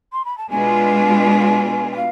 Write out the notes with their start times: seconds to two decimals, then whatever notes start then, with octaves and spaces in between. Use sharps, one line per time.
0.12 C6
0.25 B5
0.38 A5
0.50 B2 G#3 D4 F4 B4 G#5
1.92 G#5
1.96 F5